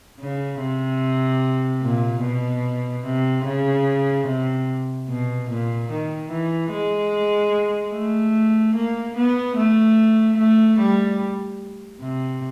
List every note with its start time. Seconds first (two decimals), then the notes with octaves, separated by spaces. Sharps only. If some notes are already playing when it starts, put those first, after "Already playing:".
0.20 C#3
0.61 C3
1.83 A#2
2.23 B2
3.05 C3
3.45 C#3
4.27 C3
5.09 B2
5.50 A#2
5.91 D#3
6.30 E3
6.72 G#3
7.93 A3
8.75 A#3
9.17 B3
9.56 A3
10.38 A3
10.79 G3
12.01 C3